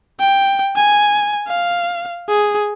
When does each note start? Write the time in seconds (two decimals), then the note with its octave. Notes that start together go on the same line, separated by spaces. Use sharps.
0.20 G5
0.76 G#5
1.48 F5
2.28 G#4